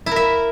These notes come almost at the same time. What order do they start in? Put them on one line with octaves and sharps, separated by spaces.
E4 A#4 E5